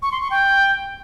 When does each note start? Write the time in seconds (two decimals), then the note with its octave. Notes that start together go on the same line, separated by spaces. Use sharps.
0.02 C#6
0.12 C6
0.21 C#6
0.31 G5